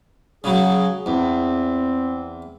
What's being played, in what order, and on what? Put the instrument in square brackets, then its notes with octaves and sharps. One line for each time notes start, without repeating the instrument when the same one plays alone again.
[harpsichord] C#3 F#3 [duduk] G#4
[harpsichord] E2 [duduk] C4